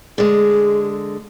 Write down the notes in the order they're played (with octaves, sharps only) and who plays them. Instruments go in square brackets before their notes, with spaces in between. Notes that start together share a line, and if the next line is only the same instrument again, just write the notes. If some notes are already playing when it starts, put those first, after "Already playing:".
[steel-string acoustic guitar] D3 G#3 [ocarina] G#4